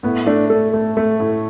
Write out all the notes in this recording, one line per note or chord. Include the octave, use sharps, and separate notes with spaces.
A2 B3
A3 D4
A3 A4
A3
A3
A2